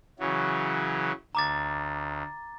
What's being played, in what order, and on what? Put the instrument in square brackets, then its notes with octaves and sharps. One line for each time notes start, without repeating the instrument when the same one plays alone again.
[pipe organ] C#3 E3 F#3
[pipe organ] D2 [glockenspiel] A#5 D6 A6